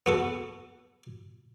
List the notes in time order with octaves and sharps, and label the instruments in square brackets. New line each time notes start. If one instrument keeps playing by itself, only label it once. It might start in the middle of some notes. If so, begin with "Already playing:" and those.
[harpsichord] B3 F#4 A4